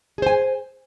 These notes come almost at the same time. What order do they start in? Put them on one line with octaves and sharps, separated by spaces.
G#4 C5 G#5